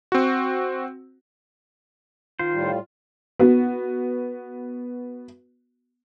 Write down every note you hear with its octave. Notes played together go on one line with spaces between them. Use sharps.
C4 F#4
D#3 F4 C5
A2 G3
B3 F#4